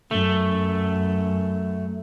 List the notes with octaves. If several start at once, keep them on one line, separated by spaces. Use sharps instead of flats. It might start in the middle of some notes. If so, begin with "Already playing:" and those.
F#2 A3